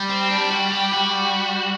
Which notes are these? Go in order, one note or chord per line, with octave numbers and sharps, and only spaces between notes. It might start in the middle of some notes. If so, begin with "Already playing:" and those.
Already playing: G3
C4
D4
F#4
G4
F#4